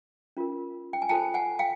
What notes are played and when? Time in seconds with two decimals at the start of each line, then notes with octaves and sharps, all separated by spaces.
0.37 C#4 F4 A#4
0.93 G5
1.02 G#5
1.09 F4 A4 C5 G5 A5
1.34 F#5 G#5
1.59 F5 G5